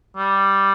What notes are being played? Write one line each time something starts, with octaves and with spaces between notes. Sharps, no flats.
G3